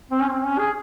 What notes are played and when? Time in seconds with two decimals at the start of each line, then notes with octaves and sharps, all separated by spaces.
0.11 C4
0.21 C#4
0.31 C4
0.45 C#4
0.58 G#4